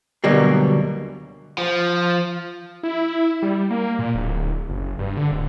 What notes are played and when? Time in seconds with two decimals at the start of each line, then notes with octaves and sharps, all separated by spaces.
0.24 D2 B2 F#3 G3 A#3
1.58 F3
2.83 E4
3.43 G3
3.70 A#3
3.99 A#2
4.15 D1
4.69 F#1
4.99 G2
5.17 D3
5.31 D1